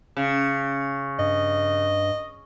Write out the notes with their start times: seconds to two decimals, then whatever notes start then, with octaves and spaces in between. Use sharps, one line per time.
0.17 C#3
1.19 G2 D#5